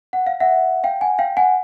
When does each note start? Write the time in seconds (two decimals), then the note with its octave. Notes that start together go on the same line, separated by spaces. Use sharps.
0.13 F#5
0.27 F5
0.40 E5 F#5
0.84 F5 G5
1.01 F#5 G#5
1.19 F5 G5
1.37 F#5 G#5